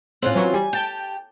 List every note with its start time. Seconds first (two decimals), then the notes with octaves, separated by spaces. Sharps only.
0.22 A2 C4 C#4 F4 F#6
0.35 E3 F#3 F#4
0.54 G3 G#5
0.73 G4 G5 A5 G6